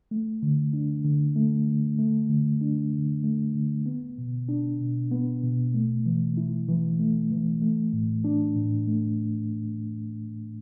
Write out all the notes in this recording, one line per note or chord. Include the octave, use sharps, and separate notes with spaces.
A3
D3
D4
D3
A3
D3
A3
D3
D4
D3
A3
D3
B3
B2
D4
B2
B3
B2
A3
E3
E4
E3
A3
E3
A3
A2
D4
A2
A3